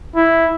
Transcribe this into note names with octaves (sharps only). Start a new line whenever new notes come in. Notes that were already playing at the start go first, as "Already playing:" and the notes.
E4